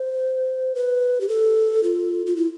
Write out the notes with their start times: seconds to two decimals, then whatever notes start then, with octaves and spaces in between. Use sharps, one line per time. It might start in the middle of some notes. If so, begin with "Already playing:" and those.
Already playing: C5
0.75 B4
1.21 G4
1.29 A4
1.83 F4
2.26 F4
2.36 E4